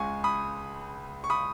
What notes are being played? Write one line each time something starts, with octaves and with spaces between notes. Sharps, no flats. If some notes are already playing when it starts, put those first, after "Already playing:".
Already playing: C#2 C#3 G#3 G#5 C#6
B5 D#6
C#6
B5 D#6